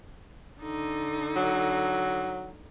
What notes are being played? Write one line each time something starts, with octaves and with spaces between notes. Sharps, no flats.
D3 D#4
F#3